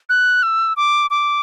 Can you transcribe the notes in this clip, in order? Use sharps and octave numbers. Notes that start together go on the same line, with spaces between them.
F#6
E6
D6
D6